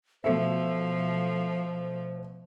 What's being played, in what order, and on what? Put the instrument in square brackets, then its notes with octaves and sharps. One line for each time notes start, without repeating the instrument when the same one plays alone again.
[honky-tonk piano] B2 A3 E5 [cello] F3 [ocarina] C5